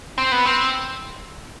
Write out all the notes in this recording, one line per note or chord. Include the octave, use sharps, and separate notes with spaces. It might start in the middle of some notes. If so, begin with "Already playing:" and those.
C4
B3
C4